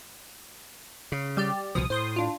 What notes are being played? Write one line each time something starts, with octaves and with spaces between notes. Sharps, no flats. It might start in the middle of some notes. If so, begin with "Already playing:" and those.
C#3
G3 G4 D5
C2 B2 F3 D#6
A2 C5 C6 D#6
D4 F4